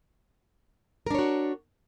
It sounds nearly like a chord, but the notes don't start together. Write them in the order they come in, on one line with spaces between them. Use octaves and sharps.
A#4 D4 C#5 F#4